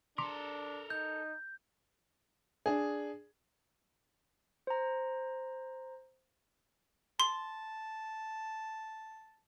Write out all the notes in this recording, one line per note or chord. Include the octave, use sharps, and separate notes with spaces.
D4 A4 A#4 C6 D6 B6
D#4 G6
D4 G#4
C5 A#5
A5 C6